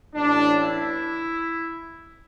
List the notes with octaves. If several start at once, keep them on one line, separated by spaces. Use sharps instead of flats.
A1 A2 E3 D4
E4